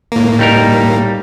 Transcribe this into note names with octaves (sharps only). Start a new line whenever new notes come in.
A2 A#3
G3 D#4 A#4